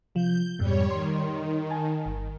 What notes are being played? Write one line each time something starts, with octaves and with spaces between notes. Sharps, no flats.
C3 F3 G6
F2 G#2 B2 G3 C#5
D#3 C6
G#5 A5
G1